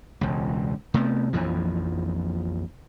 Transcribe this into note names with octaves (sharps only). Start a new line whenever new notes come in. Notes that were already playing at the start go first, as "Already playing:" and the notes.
E1 C#2
C3 A3 B3
A#1 F2 E3 F3